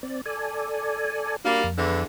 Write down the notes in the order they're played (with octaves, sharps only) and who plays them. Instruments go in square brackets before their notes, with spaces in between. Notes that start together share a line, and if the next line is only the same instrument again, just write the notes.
[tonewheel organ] C4 D5
A4 D5 G#5
[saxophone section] G3 A#3 [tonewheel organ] D4 F#4
[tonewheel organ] F2
[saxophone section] E2 D3 E3